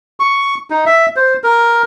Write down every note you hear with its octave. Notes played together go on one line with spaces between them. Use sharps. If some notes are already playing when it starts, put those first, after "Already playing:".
C#6
D#4
E5
C5
A#4